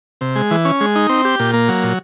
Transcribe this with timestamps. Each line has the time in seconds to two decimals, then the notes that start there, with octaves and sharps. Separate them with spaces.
0.21 C3
0.36 G#3
0.51 E3
0.65 C#4
0.81 G#3
0.96 D#4
1.09 C4
1.25 G4
1.39 A#2
1.54 A#3
1.68 F#3
1.84 A#2